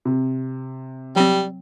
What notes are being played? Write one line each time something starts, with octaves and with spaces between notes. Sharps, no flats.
C3
F#3 G3 C4